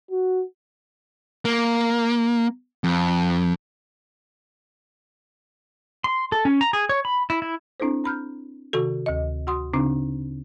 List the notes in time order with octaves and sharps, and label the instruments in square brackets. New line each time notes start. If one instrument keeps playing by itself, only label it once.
[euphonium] F#4
[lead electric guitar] A#3
F2
[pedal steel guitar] C6
A4
C#4
A#5
G#4
C#5
B5
E4
E4
[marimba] C4 D4 E4 A4 C5
A#5 B5 F6 G6
C3 D#3 F#4 A4
D2 D#5
F#4 F#5 C6 D#6
C#3 C4 D4 D#4